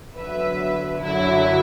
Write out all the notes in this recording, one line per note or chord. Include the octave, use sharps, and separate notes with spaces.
E2 D3 F#3 B4 E5
F#2 D3 F#3 E4